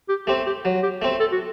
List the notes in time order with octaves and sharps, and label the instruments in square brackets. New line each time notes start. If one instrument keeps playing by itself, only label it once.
[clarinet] G4
[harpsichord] A3 C4 [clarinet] G4
[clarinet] G4
[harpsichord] F#3
[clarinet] G4
[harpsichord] A3 C4
[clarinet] A4
F#4